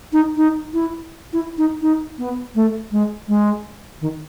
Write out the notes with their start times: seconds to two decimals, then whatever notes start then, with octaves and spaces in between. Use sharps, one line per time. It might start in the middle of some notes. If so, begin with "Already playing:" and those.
0.13 D#4
0.37 D#4
0.73 E4
1.33 E4
1.58 D#4
1.81 D#4
2.18 B3
2.55 A3
2.92 G#3
3.28 G#3
4.01 D#3